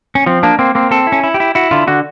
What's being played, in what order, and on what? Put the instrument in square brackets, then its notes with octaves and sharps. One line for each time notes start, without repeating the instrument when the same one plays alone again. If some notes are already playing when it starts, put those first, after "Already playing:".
[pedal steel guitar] C#4
[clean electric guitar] F3 [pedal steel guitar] C4
[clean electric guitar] A#3 [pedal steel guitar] D4
[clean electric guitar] A#3 [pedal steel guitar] C4
[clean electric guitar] A#3 [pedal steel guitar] C4
[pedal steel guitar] C4 [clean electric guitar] A4
[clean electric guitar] E4
[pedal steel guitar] C#4
[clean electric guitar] E4
[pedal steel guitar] G4
[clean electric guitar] E4
[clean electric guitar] E4 [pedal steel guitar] F#4
[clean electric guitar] D3 [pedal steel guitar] F4
[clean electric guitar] D3 [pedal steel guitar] F#4